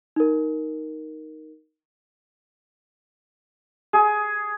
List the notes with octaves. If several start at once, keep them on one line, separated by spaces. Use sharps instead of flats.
D#4 A#4
G#4